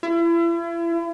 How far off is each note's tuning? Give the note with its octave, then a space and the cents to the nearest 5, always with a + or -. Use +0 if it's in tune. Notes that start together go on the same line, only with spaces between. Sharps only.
E4 +40